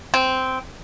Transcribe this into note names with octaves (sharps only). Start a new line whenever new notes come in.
C4